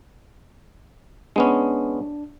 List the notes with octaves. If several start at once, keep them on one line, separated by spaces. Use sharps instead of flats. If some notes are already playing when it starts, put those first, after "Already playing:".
G#3 B3 C#4 D4